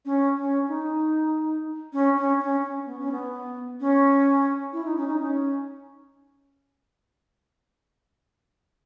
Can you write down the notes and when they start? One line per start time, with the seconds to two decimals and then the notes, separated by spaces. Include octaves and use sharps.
0.05 C#4
0.37 C#4
0.68 D#4
1.93 C#4
2.17 C#4
2.40 C#4
2.63 C#4
2.86 B3
2.99 C#4
3.11 B3
3.80 C#4
4.73 E4
4.85 D#4
4.96 C#4
5.07 D#4
5.20 C#4